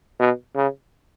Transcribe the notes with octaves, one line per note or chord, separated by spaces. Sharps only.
B2
C#3